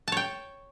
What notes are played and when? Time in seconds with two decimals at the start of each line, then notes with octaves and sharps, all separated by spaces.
0.08 A5
0.12 C#5
0.17 G5